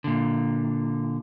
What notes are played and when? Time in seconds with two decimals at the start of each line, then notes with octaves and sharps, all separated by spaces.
0.04 A#2 D3